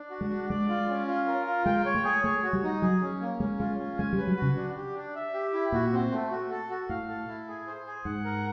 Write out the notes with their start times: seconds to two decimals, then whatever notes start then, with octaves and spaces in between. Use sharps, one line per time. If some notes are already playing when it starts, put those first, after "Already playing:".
Already playing: D4
0.10 F#4
0.21 G#3
0.30 D4
0.49 G#3 D5
0.69 F4
0.89 C#4
1.07 F4
1.28 A#4
1.46 F4
1.65 G#3 G5
1.85 C#5
1.94 A3
2.04 G#4
2.24 A3 C#5
2.43 F#4
2.53 G3
2.63 D#4
2.82 F#3 G#4
3.01 C#4
3.21 A#3
3.40 G#3 C#4
3.59 G#3 F4
3.79 C#4
3.98 G#3 G#5
4.13 G3
4.18 B4
4.27 F#3
4.37 F#4
4.42 C#3
4.56 D4
4.76 G4
4.95 D4
5.15 E5
5.34 G4
5.53 E4
5.72 A#2 F#4
5.92 C4
6.12 A3
6.31 F#4
6.51 A4
6.70 F#4
6.89 A2 F5
7.08 A4
7.28 E4
7.48 G#4
7.67 C5
7.87 G#4
8.05 G#2 F#5
8.24 A#4